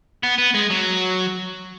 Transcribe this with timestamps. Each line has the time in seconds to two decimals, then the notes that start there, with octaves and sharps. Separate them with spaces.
0.23 B3
0.38 B3
0.54 G#3
0.70 F#3